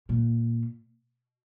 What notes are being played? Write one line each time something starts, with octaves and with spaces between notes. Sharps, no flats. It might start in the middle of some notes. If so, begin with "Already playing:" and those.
A#2